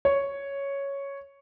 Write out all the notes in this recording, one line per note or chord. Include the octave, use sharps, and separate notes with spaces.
C#5